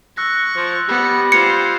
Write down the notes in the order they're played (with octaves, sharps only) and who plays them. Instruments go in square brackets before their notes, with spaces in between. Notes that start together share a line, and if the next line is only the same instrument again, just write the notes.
[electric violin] C#6 [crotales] E6 F#6 A#6
[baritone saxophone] F3
[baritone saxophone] G3 [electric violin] B3 C#7
[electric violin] F4 C5 [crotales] G#6 C7 F7 [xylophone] C#7